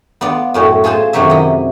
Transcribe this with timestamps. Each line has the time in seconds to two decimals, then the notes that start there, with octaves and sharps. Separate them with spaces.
0.21 B3 F4 D5
0.54 F#2 A2 C#4
0.84 F4 G#4 A4 C5 A5
1.13 F#2 C3 D#3 F#3 E5
1.30 E4 D#5